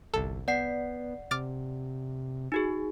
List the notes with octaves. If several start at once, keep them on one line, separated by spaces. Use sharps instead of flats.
G1 C2 A4
B3 D5 F#5 C7
C3 D6 F6 A6
D#4 F#4 G#4